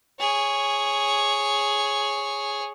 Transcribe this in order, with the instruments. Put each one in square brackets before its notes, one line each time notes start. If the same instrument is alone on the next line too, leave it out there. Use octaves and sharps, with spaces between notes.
[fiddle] G#4 C#5